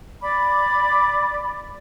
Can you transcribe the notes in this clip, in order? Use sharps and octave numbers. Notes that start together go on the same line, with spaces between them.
D5 B5 D6